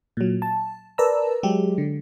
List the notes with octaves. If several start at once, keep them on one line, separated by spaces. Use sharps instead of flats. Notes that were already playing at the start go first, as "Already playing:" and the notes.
A#2 F#3
A5
A#4 B4 D5 A5 A#5 E6
F#3 G#3 G4
D3